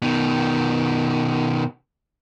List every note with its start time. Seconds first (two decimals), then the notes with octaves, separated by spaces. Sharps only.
0.02 B2 D#3